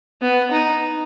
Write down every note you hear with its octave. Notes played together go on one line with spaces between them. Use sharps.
B3
D#4